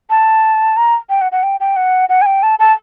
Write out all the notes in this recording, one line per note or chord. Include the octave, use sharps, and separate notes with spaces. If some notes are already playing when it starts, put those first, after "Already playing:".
A5
A#5
G5
F#5
F#5
G5
G5
F#5
F#5
G#5
G5
A5
A5